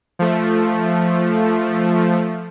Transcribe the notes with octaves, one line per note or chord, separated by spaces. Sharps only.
F3 A3